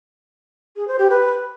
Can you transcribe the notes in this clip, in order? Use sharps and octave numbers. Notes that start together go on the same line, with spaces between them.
G#4
C5
G4
B4